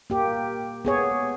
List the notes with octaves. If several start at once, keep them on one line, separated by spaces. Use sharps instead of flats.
A#3 G4
B3 G#4 C#5